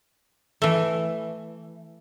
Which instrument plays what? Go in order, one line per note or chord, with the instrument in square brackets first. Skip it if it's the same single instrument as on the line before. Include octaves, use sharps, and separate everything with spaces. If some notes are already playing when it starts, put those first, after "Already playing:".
[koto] E3 A3